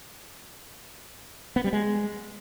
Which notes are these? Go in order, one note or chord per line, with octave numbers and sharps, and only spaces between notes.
B3
G3
G#3